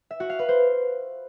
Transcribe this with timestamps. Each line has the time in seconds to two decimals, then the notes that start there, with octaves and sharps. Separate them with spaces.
0.11 E5
0.20 F#4
0.30 F5
0.39 B4
0.49 C5